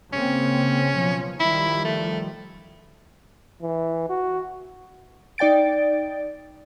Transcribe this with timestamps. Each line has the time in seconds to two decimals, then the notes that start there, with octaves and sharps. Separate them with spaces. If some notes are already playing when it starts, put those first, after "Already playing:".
0.13 C#3 A#3 C4 C#4
0.94 B2 F3 F#3
1.40 D#3 F3 G3 E4
1.84 A3
3.62 E3
4.09 F#4
5.38 D#4 D5 G5 A6 D7